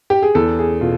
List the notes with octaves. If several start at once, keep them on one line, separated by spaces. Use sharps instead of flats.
G4
G#4
E2 A4
G#4
B2 F4